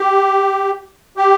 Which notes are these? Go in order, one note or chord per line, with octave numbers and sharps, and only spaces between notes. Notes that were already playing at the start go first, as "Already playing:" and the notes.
Already playing: G4
G4